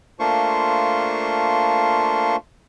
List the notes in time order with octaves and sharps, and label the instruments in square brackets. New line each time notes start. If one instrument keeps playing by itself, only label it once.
[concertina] A3 A#3 D4 F4 C5 C#6